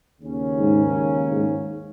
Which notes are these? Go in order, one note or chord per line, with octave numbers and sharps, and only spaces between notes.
D#2 C#3 A#3 C#4
G#2
G#2